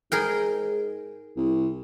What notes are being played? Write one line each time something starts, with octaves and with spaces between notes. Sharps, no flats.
G#2 G#4 A#4 G5
C2